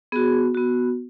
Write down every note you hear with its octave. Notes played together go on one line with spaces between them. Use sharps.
B3 F#4 G#4
B3 F#4